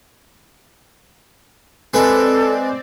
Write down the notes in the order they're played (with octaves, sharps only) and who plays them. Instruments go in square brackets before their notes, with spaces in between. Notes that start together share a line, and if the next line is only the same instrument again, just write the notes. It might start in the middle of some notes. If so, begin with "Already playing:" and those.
[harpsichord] G#3 B4 [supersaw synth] C4 D5 [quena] A4